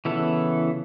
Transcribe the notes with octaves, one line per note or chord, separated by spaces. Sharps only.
C#3 E3 B3 E4 A4